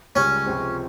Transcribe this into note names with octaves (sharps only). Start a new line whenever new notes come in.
C#2 C#3 G3 C#4
C#2 C3 F3 G#3 C4